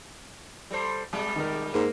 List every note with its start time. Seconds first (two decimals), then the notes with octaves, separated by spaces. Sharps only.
0.71 G3 A4 C5
1.13 B2 G3 G#3
1.36 D#3 A#4
1.74 G#2 A#3